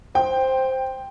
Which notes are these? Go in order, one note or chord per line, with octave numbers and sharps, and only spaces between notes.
C5 G5